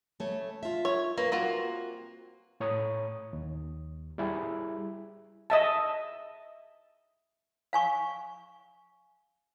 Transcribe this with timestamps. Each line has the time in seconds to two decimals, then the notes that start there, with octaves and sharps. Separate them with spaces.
0.20 C#3 A3 C#5
0.63 F4 E5
0.85 C#5
1.18 A#3 B4
1.32 C3 A#3 F4 F#4
2.60 A2 C#5 A#5 D#6
3.33 D#2
4.18 G3 E4 G#4
5.50 D#5 E5 A5
7.73 F5 G#5 C#6